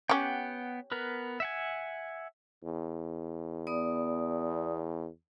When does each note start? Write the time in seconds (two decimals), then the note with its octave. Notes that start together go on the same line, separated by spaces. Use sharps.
0.09 B3 C#4 G4 F#5 G5
0.92 B3 A#4 B4
1.40 E5 F#5 G#5
2.64 E2
3.67 B3 D5 D#6